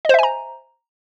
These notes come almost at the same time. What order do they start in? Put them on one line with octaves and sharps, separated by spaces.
D#5 C5 E5 G#5 A#5